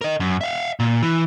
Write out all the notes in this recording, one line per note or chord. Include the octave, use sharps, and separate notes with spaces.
A#4 D#5
F#2
E5 F5
A#2
E3